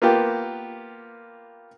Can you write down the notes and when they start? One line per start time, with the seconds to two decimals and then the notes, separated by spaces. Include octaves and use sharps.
0.02 A#3 B3 F4 G4